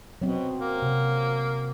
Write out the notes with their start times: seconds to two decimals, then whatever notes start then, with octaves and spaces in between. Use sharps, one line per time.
0.22 B2 F#3 C4
0.60 A#3
0.82 C3